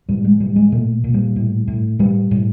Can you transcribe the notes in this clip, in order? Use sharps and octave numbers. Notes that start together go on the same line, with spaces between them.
A2 G3
G#3
A2 G3
G#3
A#2 A3
A#2
G3
A2
A2
A2 G3
A2